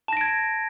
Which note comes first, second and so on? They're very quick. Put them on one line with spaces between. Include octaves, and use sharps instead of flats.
A5 A#6 D7 G#6